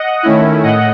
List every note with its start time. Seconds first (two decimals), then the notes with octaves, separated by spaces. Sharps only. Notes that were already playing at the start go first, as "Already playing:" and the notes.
Already playing: D#5 F#5
0.23 D#3 A3 C#4 E4
0.63 A2 D#5 F#5